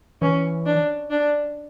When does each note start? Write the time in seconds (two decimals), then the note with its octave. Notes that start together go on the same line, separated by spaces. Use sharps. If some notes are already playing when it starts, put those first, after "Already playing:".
0.22 E3 C#4
0.66 D4
1.11 D4